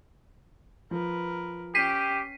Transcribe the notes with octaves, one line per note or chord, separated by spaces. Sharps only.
F3 A#4 B4
C#4 G4 G5 B6 C7 D#7